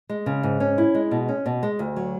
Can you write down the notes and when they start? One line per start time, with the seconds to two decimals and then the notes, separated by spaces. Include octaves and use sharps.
0.09 G#3
0.26 C#3
0.43 G#2
0.60 C#4
0.78 E4
0.95 G#3
1.11 B2
1.29 C#4
1.46 B2
1.63 G#3
1.79 D2
1.96 F#3